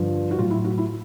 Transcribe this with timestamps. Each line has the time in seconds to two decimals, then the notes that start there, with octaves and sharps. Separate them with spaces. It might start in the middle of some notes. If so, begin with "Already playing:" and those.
Already playing: G2 D3 F3
0.31 F#4
0.38 A2 F#3 F4
0.51 E4
0.65 F#4
0.78 E4